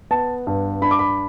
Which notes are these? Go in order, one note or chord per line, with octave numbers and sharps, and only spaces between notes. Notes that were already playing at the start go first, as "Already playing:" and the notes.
B3 A5
G2
D4 B5
D6
B5